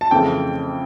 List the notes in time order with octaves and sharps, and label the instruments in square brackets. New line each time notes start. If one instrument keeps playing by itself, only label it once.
[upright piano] A5
F2 C#3 E3 A3 G5